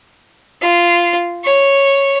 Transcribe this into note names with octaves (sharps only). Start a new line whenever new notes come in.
F4
C#5